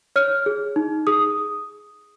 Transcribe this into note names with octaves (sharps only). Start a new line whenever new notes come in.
C#5 F6
G#4
D#4
G#4 D#6